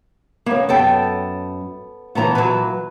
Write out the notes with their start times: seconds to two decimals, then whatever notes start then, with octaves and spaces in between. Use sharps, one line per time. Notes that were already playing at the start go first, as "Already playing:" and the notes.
0.46 A#3 B3 C#4
0.69 F#2 B3 A4 G5
2.15 A#2 E3 B3 A5 A#5
2.35 F#3 B4